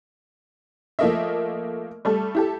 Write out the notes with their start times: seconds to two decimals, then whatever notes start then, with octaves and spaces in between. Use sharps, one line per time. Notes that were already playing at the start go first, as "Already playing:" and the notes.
0.99 F3 A3 A#3 D#5 E5
2.05 G3 A3 A4
2.35 E4 G4 A4